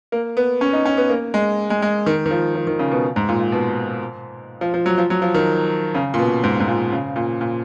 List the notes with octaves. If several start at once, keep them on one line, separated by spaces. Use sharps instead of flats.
A#3
B3
C#4
D#4
C#4
B3
A#3
G#3
G#3
G#3
D#3
D#3
F3
F3
D#3
C#3
B2
G#2
A#2
A#2
B2
F3
F3
F#3
F3
F#3
F3
D#3
C#3
A#2
B2
G#2
G#2
A#2
C#3
A#2
A#2